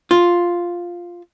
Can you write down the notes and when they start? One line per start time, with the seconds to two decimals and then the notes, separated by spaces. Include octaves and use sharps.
0.11 F4